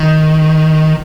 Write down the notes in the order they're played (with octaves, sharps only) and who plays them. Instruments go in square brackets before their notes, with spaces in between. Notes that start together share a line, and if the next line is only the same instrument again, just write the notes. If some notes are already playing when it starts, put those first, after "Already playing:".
Already playing: [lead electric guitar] D#3